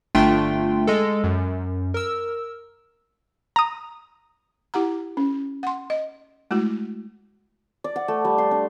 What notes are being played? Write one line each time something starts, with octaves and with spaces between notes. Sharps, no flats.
G1 A3 D4 F4 G5 C6
G#3 A4
F#2
A#4 E6
A#5 D#6
E4 G4 F#5 A#5
C#4
F#5 C6
D#5
G#3 A3 E4 F#4
D5
F#5
A3
G3
C6
D4